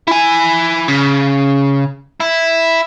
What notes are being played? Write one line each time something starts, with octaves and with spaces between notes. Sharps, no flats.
E4 G#5
C#3
E4